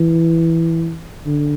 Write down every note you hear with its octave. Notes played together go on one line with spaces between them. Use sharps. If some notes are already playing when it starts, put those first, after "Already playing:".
Already playing: E3
D3